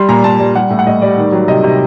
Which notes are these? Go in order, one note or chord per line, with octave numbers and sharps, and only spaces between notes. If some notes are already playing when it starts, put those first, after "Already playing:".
Already playing: G3 C6
A#2 A#5
A#2 A5
G3
G3 F#5
A2
F#5
A2 D#5
G3 D5
D#3
F#3
C3 D#5
C3